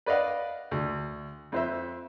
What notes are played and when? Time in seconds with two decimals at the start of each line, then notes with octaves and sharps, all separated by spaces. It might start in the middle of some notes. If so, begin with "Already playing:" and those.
0.06 B4 D5 D#5 F5 F#5
0.71 D2
1.52 F2 C5 E5